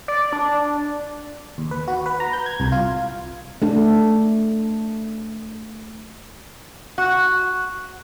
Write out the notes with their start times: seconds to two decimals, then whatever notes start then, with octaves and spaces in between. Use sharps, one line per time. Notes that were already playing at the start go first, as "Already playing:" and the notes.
0.08 D5
0.33 D4
1.58 D#2
1.71 B4
1.88 F#4
2.06 B4
2.20 A#5
2.33 G6
2.46 G#6
2.60 C2
2.72 F4
3.62 A3 D4
6.98 F#4